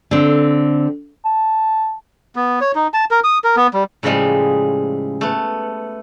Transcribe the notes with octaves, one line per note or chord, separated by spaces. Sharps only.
D3 C4
A5
B3
C#5
D#4
A5
A#4
D#6
A#4
B3
G3
A2 C#3 F3 G3 G#3 G#4
A3 B3